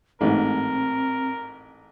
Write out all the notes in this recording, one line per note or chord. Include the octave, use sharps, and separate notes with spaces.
A1 G#2 C4 A#4